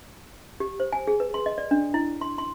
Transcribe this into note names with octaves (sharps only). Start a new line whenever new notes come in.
G4
C5
G#5
G#4
B4
C6
D#5
D5
D4
E4
C6
C6